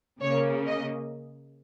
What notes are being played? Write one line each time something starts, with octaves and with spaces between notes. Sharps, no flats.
C#3 A#3 C#5
D#5